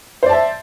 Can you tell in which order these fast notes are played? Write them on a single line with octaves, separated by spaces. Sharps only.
C5 D5 A5 E5